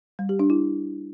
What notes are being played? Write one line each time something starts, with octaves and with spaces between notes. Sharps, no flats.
G3
G4
D4
E4